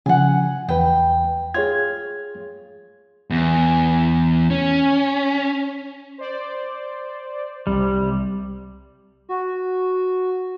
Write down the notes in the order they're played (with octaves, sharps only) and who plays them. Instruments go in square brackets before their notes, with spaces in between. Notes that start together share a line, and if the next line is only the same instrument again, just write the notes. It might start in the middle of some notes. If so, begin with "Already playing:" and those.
[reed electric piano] C#3 F3 [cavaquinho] F#5 G#5
[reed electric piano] E2 B4 [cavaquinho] G5
[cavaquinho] F4 [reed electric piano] G#4 C#5 G#6
[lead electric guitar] E2
C#4
[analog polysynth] C5 D5
[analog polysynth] C2 C3 [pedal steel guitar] G3
[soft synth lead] F#4